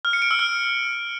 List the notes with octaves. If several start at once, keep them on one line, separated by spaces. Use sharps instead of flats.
F6
C#7
D7
E6
F6